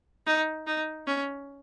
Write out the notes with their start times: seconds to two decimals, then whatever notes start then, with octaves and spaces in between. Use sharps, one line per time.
0.27 D#4
0.67 D#4
1.07 C#4